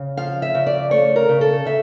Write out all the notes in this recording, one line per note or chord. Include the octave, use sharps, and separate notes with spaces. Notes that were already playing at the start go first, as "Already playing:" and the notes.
Already playing: C#3
F3 F5
E5
C#3
D5
A3 C#5
A#4
C#3
A4
C#3 E5